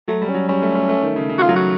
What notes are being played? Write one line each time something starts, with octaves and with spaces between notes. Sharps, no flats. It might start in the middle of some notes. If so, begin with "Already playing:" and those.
F#3 A3
G3
C#4
F#3
G3 C#4
A3
A3
A3
D#3
C#3
C#3
F#4
F4
F#3
F#4